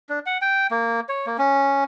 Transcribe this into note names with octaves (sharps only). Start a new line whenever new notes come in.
D4
F#5
G5
A#3
C#5
A#3
C#4